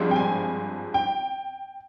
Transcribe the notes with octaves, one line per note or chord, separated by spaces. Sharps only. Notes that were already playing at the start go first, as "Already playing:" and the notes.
Already playing: G#1 G2 F3 G#3 C4
G5
G#5
G5